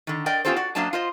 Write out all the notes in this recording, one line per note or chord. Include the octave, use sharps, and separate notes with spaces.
D3 D#3
A#4 D5 D#5 G5
B3 C#4 F4 G4 A4 C5
F#4 D5 F#5
F#2 F#3 A#3 D4 D#5 A5
F4 C5 D#5